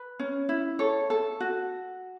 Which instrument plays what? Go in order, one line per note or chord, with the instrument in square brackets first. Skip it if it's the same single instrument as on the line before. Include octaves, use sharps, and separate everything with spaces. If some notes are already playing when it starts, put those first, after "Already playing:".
Already playing: [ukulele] B4
C#4
E4
A4 C#5
A4
F#4